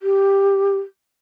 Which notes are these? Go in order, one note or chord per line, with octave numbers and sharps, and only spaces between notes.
G4